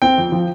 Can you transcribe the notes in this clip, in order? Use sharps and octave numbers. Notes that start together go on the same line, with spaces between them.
C4 G5
F2
F3